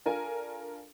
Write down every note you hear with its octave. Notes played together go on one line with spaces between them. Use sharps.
D4 F4 A4 A#4 G#5